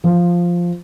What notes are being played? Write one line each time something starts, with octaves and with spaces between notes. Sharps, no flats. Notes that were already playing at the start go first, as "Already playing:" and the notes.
F3